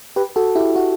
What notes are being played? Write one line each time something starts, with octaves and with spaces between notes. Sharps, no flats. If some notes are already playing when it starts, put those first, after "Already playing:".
G4 B4
F#4 A4
E4 G4
F#4